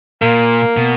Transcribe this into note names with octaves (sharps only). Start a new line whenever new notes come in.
A#2 A#3
B2